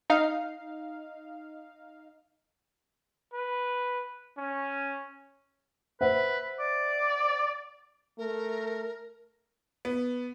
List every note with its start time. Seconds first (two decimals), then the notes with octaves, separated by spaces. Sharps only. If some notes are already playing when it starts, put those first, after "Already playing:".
0.10 D#4 F5
3.33 B4
4.38 C#4
6.01 B4 C5 E5 F#5
6.59 D5
8.18 A3 A#4
9.85 B3